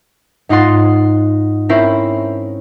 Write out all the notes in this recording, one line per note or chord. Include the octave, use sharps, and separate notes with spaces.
G#2 D#4 F4 F#5 C6 A6
C4 C#4 E4 A#4 C5